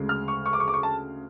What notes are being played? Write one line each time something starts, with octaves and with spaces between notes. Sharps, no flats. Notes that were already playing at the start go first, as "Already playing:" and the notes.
Already playing: D2 C#3 G#3
F6
C#6
C#6
D6
C#6
D6
C#6
A5